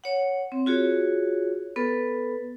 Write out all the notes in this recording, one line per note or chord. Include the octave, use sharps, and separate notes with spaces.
C#5 F#5
C4
F4 F#4 G#4 C#5
B3 A4 B4